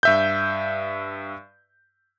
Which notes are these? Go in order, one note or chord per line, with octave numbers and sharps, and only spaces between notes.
G2 E5 G6